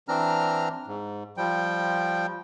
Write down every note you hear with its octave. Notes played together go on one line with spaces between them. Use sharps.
E3 C4 D4 A#5 F6
G#2
F3 G3 G5